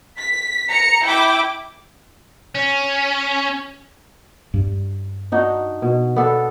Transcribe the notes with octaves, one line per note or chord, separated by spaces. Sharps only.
B6
A#5 C#7
E4 G5 D6
C#4
G2
D4 D#4 F#4
B2
B3 D4 A4